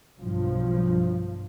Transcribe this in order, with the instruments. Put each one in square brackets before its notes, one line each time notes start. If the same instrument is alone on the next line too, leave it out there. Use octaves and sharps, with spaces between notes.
[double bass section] B1 G2 F3